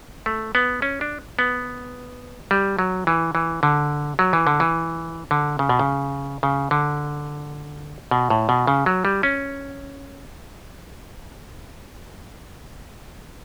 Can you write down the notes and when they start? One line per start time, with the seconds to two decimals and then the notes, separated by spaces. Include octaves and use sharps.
0.26 A3
0.55 B3
0.82 C#4
1.01 D4
1.39 B3
2.51 G3
2.79 F#3
3.07 E3
3.35 E3
3.63 D3
4.19 F#3
4.33 E3
4.47 D3
4.60 E3
5.31 D3
5.59 C#3
5.69 B2
5.79 C#3
6.43 C#3
6.71 D3
8.11 B2
8.30 A2
8.49 B2
8.67 C#3
8.86 F#3
9.05 G3
9.23 C#4